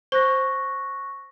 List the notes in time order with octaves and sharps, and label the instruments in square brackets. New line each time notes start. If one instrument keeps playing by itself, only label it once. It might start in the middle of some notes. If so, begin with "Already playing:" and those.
[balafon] C5 [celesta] C#6 F#6 A#6